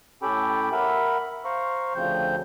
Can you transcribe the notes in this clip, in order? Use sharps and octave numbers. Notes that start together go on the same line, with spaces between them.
A2 C#4 G4 A4 G5 B5
A#4 E5 F#5 B5
C5 F5 A#5 C#6
D2 C#3 F3 C4 G6